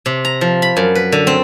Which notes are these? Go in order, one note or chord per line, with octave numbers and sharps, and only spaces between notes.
C3
A#5
F3
B5
F#2
B4
D3
C4